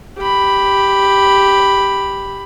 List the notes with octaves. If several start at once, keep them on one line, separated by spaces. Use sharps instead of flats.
G4 B5